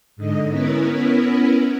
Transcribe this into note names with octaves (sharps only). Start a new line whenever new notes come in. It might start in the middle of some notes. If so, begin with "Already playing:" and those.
G#2 D3 D#5
B3 C#4 E4 A#4 B4